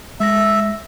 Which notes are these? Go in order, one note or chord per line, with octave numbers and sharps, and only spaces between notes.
G#3 E5 A#6